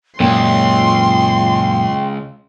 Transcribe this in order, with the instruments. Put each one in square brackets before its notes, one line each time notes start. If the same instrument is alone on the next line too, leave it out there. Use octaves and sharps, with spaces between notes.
[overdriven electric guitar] C#2 [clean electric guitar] F#2 A#2 [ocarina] G5 [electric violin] C6